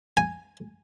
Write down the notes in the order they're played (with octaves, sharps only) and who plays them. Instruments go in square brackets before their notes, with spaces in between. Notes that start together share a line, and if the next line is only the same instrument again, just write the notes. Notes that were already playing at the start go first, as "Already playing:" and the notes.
[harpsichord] G#5